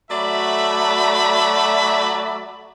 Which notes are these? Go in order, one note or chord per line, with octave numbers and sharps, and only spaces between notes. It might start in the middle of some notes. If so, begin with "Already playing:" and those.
F#3 A3 F#4 D5 E5 B5